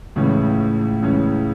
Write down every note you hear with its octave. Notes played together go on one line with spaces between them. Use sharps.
C#2 A2 C#3 E3 C#4
C#2 C#3 E3 C#4